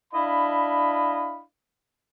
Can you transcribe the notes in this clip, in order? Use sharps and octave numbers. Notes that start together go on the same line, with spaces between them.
D4 E4 D#5 F5 B5